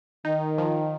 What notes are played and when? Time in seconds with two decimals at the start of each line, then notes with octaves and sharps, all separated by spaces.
0.25 D#3 D#4
0.58 F3